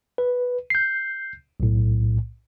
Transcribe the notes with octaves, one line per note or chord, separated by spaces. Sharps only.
B4
G6 C7
B1 A2